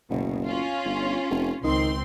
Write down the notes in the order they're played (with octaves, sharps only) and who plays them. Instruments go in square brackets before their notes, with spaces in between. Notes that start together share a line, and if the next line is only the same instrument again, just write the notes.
[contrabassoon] F#1 [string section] D2 B2
[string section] C#4 F4
[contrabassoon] G1
F1
[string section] C#2 C4 C6 [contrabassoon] D#3